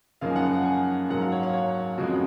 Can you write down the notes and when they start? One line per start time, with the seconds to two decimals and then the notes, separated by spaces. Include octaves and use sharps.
0.21 F#2 C#3 F3 A#3 D#4 F5
0.30 G#5
0.36 F#5
0.52 F#5
0.65 G#5
1.09 G#2 F#3 A#3 F#5
1.21 F5
1.32 C#5
1.43 F5
1.53 C#5
1.97 F2 C#3 F3 G#3 F#4